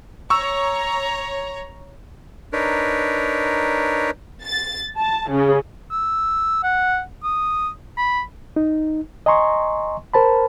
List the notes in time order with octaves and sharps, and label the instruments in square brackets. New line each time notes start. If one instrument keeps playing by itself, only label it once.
[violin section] C#5 A#5 [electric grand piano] C#6 E6
[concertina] D4 D#4 A#4 B4 C#5
[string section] A6
A5
C#3
[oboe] E6
F#5
D#6
B5
[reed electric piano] D#4
D#5 G#5 A#5 C6 C#6
A#4 C5 A5 B5